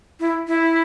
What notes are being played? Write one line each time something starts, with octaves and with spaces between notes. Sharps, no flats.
E4
E4